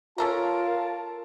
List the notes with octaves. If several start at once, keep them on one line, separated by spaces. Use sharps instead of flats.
C#4 F4 A4 A#4 A5 A#5